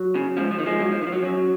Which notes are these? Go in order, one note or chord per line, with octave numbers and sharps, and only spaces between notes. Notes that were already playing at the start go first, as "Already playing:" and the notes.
Already playing: F#3
C#3
G#2 F3
F3
D#3
F3 G#3
G#2 F#3
F3
D#3
F3
F#3
F#2 F#3